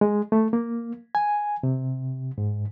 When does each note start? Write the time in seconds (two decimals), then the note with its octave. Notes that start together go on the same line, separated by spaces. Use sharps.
0.01 G#3
0.32 A3
0.53 A#3
1.15 G#5
1.63 C3
2.38 G#2